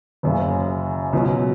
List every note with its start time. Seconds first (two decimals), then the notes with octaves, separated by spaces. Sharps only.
0.23 F#1 F#2 C#3
1.13 C#2 B2 F#3